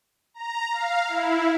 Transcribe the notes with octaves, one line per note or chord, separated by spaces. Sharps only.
A#5
F5
E4